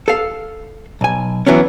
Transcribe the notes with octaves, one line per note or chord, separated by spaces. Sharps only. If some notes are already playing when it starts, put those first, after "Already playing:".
A4 F5
B1 G#5
E3 F#3 B3 C#4